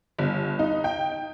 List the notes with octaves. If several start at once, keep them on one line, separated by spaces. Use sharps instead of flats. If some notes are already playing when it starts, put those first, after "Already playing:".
G1
D#4
G5